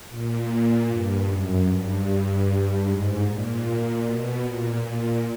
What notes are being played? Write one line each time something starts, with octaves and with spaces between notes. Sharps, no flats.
A#2
G2
F#2
G2
G#2
A#2
B2
A#2
A#2